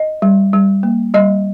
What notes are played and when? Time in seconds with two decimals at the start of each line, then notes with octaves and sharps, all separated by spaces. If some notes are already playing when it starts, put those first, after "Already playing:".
Already playing: D#5
0.22 G3
0.53 G3
0.83 A#3
1.14 G3 D#5